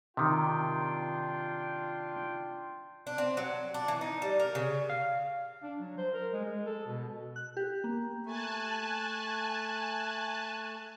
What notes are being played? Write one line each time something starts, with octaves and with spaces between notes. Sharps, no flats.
C3 D#3 D4 F4 G5
D4
C4
F#3
D4
E3
D#4
G3
A#4
C#3
F5
D4
F#3
C5
A#4
G#3
G#3
A4
B2
F#6
G4
A#3
A3 G#5 A5 F#6